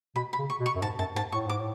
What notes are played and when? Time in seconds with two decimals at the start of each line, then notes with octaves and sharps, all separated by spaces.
0.15 B2 B5
0.33 B5
0.39 C#3
0.50 C#6
0.60 B2
0.66 C#6
0.75 F#2
0.82 G#2 A5
0.99 F#2 A5
1.16 G#2 A5
1.32 A2 C#6
1.47 G#2 D6
1.59 A2